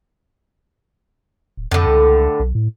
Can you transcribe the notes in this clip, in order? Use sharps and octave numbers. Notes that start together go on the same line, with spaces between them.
D1
F2 A2 D3
C#2
B1
A2